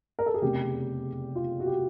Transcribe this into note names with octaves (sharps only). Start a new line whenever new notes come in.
A#4
A4
G#4
F1 E2 C#3 G4
F4
F#4
G4